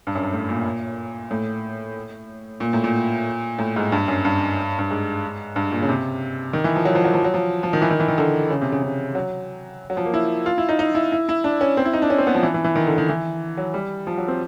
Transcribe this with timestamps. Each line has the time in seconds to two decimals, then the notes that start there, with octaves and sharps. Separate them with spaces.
0.07 G2
0.15 F#2
0.23 G2
0.32 A2
0.49 A#2
1.31 A2
2.60 A#2
2.73 A2
2.84 A#2
3.59 A2
3.76 G#2
3.92 G2
4.08 F#2
4.25 G2
4.79 G2
4.90 G#2
5.56 G2
5.71 A#2
5.82 C#3
5.89 C3
6.53 D#3
6.64 E3
6.75 F3
6.85 F#3
6.95 F3
7.04 F#3
7.14 F3
7.24 F#3
7.34 F3
7.63 F3
7.73 D#3
7.82 E3
7.90 D#3
8.00 E3
8.08 D#3
8.18 D3
8.50 C#3
8.61 C3
8.72 C#3
8.83 C#3
9.15 F#3
9.90 F#3
9.97 F3
10.05 A#3
10.14 E4
10.46 F4
10.58 E4
10.69 D#4
10.79 D#4
10.95 E4
11.12 E4
11.29 E4
11.44 D4
11.61 C#4
11.77 C4
11.85 E4
11.93 D#4
12.02 D4
12.10 C#4
12.18 C4
12.27 B3
12.35 F3
12.43 E3
12.54 E3
12.64 E3
12.75 D#3
12.87 D3
12.98 D#3
13.09 E3
13.57 F#3
13.74 G3
14.07 F3
14.18 F#3
14.28 C4